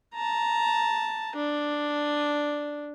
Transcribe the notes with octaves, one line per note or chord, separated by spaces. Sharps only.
A5 A#5
D4